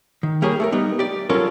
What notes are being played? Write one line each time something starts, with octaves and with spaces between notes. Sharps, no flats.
D#3
G3 A#3 G4 G#4 C#5
A3 G#4 A#4
G3 B3 D#4
G4 D5
F#3 G3 C#4 F4 A4 A#4